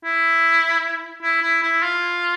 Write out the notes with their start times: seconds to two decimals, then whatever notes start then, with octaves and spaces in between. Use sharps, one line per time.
0.04 E4
1.22 E4
1.42 E4
1.62 E4
1.82 F4